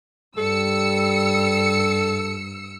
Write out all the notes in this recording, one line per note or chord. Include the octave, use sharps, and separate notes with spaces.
G2 G3 A4 E6 C#7